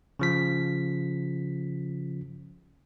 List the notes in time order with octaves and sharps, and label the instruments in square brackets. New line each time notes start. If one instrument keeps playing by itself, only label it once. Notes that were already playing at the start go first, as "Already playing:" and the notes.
[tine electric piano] C#3 F3 B6